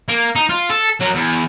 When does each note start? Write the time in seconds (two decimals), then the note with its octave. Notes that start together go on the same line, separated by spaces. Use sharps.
0.09 A#3
0.36 D#4
0.49 F4
0.70 A4
1.00 F#3 A#4
1.15 E2